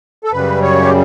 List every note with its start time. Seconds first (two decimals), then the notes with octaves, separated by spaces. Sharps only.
0.24 A4
0.32 F#2 C#3 G3 B4
0.62 C#5
0.82 G4